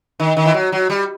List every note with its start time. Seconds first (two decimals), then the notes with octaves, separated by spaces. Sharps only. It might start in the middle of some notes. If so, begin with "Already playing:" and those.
0.20 D#3
0.37 D#3
0.46 E3
0.54 F#3
0.72 F#3
0.90 G3